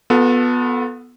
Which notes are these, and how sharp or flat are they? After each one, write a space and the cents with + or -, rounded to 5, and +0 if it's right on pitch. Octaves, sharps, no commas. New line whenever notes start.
B3 +0 F4 +45 A4 +0